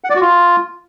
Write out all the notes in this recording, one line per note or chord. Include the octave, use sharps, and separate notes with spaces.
F#5
D5
F#4
F4